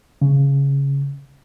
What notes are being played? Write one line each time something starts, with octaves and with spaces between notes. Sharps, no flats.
C#3